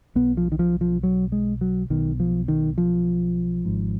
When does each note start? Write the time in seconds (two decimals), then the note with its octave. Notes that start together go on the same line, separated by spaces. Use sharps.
0.15 B1 B2 B3
0.37 F3
0.52 D#3
0.59 F3
0.81 F3
1.03 F#3
1.32 G#3
1.61 F#3
1.90 B1 B2 D#3
2.20 F3
2.48 D#3
2.78 F3
3.65 G#1 G#2